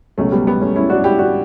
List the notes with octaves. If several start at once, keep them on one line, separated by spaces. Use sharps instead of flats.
C#2 B2 F#3 A3 C#4
G3 B3
G3 B3
A3 C#4
C#4 E4
D4 F#4
E4 G4
D4 F#4